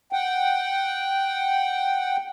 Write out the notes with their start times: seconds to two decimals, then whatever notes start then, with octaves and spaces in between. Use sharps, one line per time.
0.13 F#5 G5